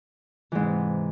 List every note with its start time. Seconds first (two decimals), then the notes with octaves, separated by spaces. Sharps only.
0.52 E3
0.55 G#2
0.59 C3